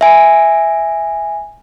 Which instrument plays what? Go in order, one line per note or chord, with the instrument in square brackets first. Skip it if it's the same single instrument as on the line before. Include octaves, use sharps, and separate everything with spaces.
[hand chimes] E5 G#5